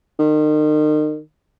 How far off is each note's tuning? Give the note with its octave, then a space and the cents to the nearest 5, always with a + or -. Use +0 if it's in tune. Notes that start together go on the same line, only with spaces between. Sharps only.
D#3 -35